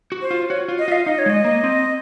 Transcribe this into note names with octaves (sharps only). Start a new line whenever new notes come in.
F#4
C5
F4
F#4 C#5
F4
D#5
F4 F5
D#4 D#5
C#5
G#3 D#5
A#3
C4